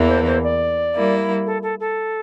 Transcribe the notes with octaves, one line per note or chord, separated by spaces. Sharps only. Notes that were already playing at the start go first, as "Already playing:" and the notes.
Already playing: E2 E3 A#3 E4
C5
C5
D5
G3 A#3 E4
A4
A4
A4